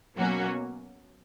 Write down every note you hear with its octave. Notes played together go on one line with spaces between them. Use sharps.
B2 F#3 A#3 C#4 F#4